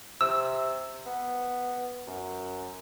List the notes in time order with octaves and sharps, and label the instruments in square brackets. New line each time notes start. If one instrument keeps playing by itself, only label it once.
[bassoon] C3 [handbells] E6
[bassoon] B3
F#2